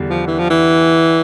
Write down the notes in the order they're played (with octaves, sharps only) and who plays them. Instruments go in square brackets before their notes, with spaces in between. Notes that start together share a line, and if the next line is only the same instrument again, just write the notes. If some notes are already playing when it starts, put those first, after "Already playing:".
Already playing: [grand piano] E2 D3 G3 D4
[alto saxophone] F3
E3
F3
E3